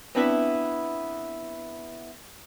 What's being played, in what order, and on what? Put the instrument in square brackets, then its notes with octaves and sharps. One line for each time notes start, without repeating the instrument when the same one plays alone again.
[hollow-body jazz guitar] B3 C4 D4 E4 B4 E5